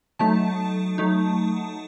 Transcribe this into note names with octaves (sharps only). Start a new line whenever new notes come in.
F#3 A3 D#4 A5
F#3 A3 D#4